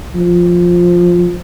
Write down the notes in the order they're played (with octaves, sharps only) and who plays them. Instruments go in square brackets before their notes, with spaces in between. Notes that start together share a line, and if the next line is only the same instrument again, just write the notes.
[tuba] F3